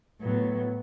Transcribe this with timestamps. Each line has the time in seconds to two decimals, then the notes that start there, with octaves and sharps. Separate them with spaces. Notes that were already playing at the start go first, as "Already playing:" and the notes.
0.21 A2 F#3 B3